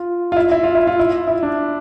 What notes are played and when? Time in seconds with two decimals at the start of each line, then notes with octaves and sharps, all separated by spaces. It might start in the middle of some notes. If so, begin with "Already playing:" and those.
Already playing: F4
0.32 F4
0.36 E4
0.52 E4
0.63 F4
0.75 E4
0.87 F4
0.99 E4
1.28 E4
1.43 D4